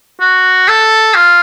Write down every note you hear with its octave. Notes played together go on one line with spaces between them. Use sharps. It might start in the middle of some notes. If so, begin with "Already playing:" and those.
F#4
A4
F4